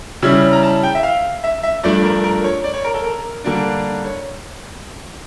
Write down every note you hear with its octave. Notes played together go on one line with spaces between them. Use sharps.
C#3 G3 C#4 E4 E6
A#5
A5
G5
E5
F5
E5
E5
G2 F3 A3 D4 D5
A#4
A#4
C#5
D5
C#5
A#4
A4
A#4
D3 G3 A#3 D4
C#5